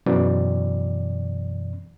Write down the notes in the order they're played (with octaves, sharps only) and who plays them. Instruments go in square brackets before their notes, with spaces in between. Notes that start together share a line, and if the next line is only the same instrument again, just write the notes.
[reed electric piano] F#2 B2 E3 D5